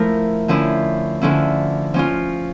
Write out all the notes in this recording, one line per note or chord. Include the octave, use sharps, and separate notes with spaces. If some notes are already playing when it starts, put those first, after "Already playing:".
Already playing: F3 A3 E4 A#4
D3 F3 C#4 E4
D3 F3 C#4 E4
F3 C#4 F4